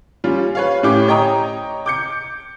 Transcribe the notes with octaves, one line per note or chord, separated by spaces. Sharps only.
G3 C#4 F4
B4 C#5 F5
A2 C#4 E4 G4 D6
C#5 D#5 G5 A#5 D#6
D6 G6 C#7